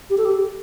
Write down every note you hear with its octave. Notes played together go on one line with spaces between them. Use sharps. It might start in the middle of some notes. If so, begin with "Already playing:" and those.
G4
A4
G4